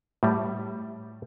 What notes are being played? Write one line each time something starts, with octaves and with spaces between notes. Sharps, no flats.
A2 G3